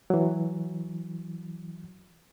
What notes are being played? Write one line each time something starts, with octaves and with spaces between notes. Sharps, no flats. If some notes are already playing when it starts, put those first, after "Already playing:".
E3 F#3